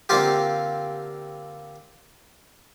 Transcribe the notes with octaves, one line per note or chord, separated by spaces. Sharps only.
D3 A#3 C4 F4 G4